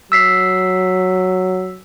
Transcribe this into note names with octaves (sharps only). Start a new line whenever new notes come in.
F#3 E6 B6 C7